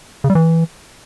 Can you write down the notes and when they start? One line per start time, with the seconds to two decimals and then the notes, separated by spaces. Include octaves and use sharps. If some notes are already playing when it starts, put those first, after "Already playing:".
0.24 C#3
0.30 G3
0.35 E3